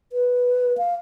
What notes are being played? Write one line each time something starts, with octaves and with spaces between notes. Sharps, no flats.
B4
F5